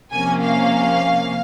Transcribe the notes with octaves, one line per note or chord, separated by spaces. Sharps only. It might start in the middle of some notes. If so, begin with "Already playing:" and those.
C3 F3 A#3 C#4 G#5
F5